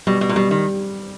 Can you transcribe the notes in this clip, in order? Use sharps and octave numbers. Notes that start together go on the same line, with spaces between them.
B2 G3
B2
A#2
B2 G3
D#3